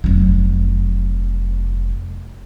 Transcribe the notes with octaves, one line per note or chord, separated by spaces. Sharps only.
F1 F#3